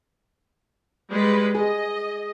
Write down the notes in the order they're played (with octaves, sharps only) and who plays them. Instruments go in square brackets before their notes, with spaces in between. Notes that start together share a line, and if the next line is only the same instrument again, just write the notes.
[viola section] G3 G#3 B4
[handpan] G#4 [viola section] D#5